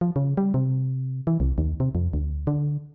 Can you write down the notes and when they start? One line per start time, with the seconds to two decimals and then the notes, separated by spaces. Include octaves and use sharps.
0.01 F3
0.16 C#3
0.37 G3
0.54 C3
1.27 E3
1.40 C2
1.58 D#2
1.80 C3
1.95 F2
2.13 D2
2.47 D3